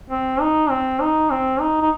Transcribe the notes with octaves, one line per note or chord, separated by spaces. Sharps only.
C4
D#4
C4
D#4
C4
D#4
D#4